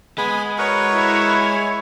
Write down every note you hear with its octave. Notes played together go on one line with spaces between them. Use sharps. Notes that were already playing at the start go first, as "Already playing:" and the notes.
G#3 B3 G#5 B5
F#4 A#4 B4 C#5
E4
G#5